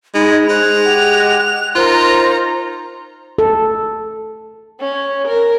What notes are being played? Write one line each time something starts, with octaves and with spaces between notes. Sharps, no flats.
G#3 D#4 B5
G#3 C5 F#6 F7
G4 F#5 G5
D#4 F4 A#4 C5 A#5
A4
C#4
A#4